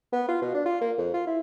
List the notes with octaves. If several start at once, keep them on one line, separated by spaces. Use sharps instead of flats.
B3
F4
B2
D4
F4
A#3
F2
F4
E4